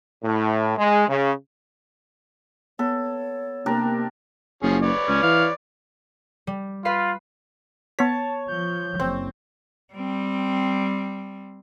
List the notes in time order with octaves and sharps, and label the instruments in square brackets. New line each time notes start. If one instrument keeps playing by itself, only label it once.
[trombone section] A2
G#3
C#3
[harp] B3 [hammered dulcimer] A4 [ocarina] C#5
[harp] C3 [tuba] A#3 [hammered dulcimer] D4 G4 A#4
[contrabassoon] F#1 [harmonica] F3 C#4 G#4
[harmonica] B4 C#5 D5
[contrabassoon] C#2 [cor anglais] C#4
[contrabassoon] E3 [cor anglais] F5
[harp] G3
[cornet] F4 [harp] B4 F5 B5
[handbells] B3 B6 [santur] C#5 [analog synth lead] A5
[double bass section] F3 [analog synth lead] G6
[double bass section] F#1 [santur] C4
[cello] G3 C4